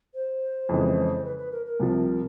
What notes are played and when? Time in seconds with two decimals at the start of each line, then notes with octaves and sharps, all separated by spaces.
0.14 C5
0.69 F2 C#3 E3 G#3
1.25 B4
1.38 B4
1.51 A#4
1.66 A#4
1.80 C2 C3 F3